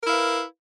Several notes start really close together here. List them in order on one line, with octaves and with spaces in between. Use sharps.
A#4 E4 F5 B4